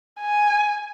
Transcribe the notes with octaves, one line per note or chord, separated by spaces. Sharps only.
G#5